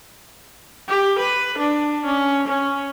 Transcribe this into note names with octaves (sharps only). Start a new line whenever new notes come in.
G4
B4
D4
C#4
C#4